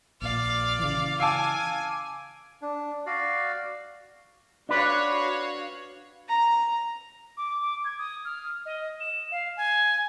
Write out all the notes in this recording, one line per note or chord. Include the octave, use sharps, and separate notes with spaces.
A#1 A#2 D5 F5
C#3 E3
F5 G#5 A5 D6 E6 D7
D4
F#4 D5 F5
D4 F#4 B4 C#5 F5
A#5
D6
D6
G#6
D#6
F6
D#5
E7
F5
G#5